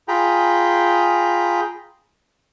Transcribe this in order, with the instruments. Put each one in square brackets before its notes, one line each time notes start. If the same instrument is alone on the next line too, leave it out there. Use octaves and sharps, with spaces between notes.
[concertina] F4 G#4 G5 A#5 B5